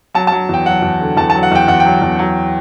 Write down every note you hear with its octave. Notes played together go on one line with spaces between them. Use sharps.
F#3 A5
F#3 A5
E2 G5
F#3 F#5
E2
D3
E2 A5
A5
F#3
F#5
E2 G5
E2 F#5
G5
F#3
E2
F#3